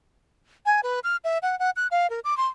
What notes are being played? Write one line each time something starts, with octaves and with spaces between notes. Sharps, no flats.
G#5
B4
F6
E5
F#5
F#5
F#6
F5
A#4
D6
C6